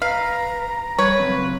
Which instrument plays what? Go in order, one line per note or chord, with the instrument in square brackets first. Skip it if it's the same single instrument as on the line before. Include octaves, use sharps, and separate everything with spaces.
[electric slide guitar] B4 [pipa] F5 [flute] A#5
[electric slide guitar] G3 [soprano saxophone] B4 [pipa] C#5
[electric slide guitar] C#3 F#3 C4